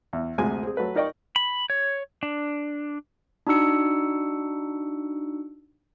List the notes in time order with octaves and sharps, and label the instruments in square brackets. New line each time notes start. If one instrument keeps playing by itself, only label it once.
[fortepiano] E2
D2 C3 G#3 G#5
C4 G#4
F#3 A3 B4
D#4 A#4 D5 D#5 G5 C#6
[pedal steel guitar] B5
C#5
D4
[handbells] D4 D#4 F#4 E6 C#7